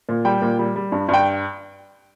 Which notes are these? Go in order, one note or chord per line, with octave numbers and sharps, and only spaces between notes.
A#2
G3 G5
A#2
G3
G3
G2
G2
G5